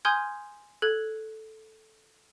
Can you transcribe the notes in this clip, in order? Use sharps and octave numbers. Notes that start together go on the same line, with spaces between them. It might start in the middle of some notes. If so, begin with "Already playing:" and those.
G#5 C6 D#6 F6 G6 G#6
A4 F#6 G#6